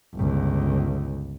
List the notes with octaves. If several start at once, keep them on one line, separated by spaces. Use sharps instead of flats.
G1 C#2